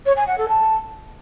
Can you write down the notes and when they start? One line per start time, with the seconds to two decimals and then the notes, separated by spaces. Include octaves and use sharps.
0.06 C#5
0.16 G#5
0.27 F#5
0.38 A4
0.48 A5